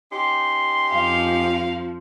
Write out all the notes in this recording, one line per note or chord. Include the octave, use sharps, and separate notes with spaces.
C#4 D#4 G4 C6
F2 F3 F5